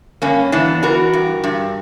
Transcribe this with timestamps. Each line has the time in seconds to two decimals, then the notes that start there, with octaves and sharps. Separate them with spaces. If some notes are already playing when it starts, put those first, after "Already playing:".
0.22 G2 A#3 C#4
0.52 E3 B3 D4
0.83 E3 F#4 A#4
1.13 G2
1.44 G2